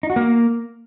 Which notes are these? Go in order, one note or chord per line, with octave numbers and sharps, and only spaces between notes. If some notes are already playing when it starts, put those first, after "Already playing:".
D#4
F#4
A#3